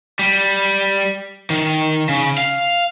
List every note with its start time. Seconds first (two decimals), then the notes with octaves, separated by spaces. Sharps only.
0.19 G3
1.50 D#3
2.09 C#3
2.38 F5